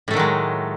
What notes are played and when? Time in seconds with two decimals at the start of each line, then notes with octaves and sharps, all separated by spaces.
0.08 A2
0.11 A3
0.14 D#3
0.17 F#3
0.19 G#3